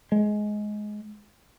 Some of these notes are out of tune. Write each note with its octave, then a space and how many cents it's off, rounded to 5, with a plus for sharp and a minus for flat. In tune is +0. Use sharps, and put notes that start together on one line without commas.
G#3 +15